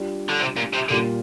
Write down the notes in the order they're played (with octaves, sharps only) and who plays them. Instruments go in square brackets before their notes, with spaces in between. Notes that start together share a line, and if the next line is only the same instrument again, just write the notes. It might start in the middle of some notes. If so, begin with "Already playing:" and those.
Already playing: [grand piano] G3 D4 F4
[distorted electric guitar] D3
C3
A#2
C3
[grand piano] A#2 G3 A#3 F4 [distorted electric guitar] D3